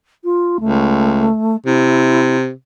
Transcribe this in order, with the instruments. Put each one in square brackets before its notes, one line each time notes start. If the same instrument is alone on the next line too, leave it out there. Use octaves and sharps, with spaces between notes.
[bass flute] F4
[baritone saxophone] C#2 [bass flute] A3
[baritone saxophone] C3 [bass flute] E4